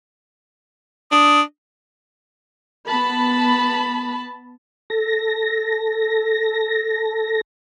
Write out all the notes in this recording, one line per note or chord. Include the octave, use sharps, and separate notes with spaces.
D4 D#6
B3 A5 B5
A4 A#6